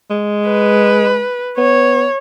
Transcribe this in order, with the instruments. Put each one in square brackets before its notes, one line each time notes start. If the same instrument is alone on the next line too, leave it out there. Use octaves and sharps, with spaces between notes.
[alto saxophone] G#3
[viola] B4
[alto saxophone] B3 [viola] C#5